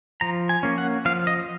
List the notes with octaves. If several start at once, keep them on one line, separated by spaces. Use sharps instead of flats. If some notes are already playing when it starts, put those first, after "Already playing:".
F3 A#5
G#5
A#3 C#4
F#5
F3 F5
D#5